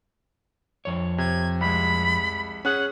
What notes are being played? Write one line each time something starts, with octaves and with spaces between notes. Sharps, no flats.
F2 C#5
C3 G#6
C2 G#3 B5
C#4 G#4 F#5